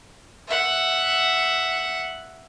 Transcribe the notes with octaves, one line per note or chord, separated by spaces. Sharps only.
E5 F#5